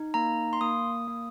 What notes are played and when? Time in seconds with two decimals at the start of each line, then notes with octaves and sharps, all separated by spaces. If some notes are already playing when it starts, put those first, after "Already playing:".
Already playing: D#4
0.14 A#3 A#5
0.53 C6
0.61 A#3 D#6
1.07 A#3